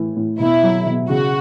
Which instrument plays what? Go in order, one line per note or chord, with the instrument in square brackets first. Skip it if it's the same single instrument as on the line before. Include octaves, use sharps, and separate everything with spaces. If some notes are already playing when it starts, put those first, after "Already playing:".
Already playing: [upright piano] A2 E3
A2
[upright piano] B2 [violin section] E4
[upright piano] F#3
B2
[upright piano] C#3 [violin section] F#4